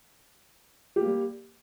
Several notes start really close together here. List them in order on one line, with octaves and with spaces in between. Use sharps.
G4 A#3 G3